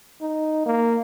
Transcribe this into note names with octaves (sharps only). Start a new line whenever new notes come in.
D#4
A#3